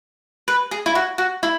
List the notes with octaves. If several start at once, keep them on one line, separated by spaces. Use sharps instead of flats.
B4
G#4
E4
F#4
F#4
E4